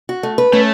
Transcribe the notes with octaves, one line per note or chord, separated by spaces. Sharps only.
F#4
A3
B4
A3 C#4